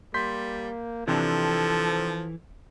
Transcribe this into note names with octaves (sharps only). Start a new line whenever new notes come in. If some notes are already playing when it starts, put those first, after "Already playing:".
G3 A#3 C6 G6 B6
C3 E3 F3 C4 D4 A4